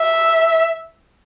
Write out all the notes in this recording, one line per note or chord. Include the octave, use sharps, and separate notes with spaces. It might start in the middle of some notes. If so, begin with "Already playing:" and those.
Already playing: E5